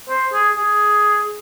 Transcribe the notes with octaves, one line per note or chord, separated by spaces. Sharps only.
C5
G#4
G#4